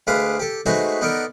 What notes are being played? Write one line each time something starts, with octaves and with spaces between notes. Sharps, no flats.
D2 G#3 B4 F5 D6 D#6
G4 A4
G#3 A3 D#4 F#4 B4 C5
B3 D#4 A4 A#4 D5